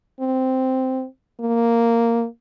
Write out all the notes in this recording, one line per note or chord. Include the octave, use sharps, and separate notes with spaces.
C4
A#3